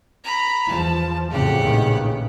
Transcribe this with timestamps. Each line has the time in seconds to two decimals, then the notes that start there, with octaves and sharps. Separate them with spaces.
0.24 A#5 B5
0.68 E2 F3 A5
1.31 F2 A2 C#3 G4 F#5
1.61 A#1 D#3 B3